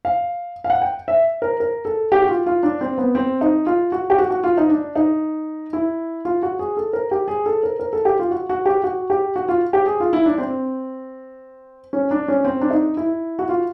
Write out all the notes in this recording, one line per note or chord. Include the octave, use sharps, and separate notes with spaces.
F5
F5
F#5
G5
E5
A#4
A#4
A4
G4
F#4
F4
F4
D4
C4
B3
C4
D#4
F4
F#4
G4
F#4
F#4
F4
D#4
D4
D#4
E4
F4
F#4
G#4
A4
A#4
G4
G#4
A4
A#4
A#4
A4
G4
F4
F#4
F#4
G4
F#4
G4
F#4
F4
G4
G#4
F4
E4
D4
C4
C#4
D4
C#4
C4
D4
D#4
E4
F#4
F4